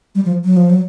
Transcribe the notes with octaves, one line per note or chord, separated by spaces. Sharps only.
G3
F3
F#3
F3
F#3